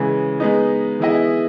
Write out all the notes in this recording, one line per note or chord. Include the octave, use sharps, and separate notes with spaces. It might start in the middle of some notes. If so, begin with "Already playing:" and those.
Already playing: C#3 E3 G#3
G#3 B3 D#4
E3 B3 E4 G#4 D#5